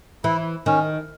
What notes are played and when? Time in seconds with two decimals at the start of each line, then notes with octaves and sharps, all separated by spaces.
0.24 E3 E4
0.66 D#3 C#4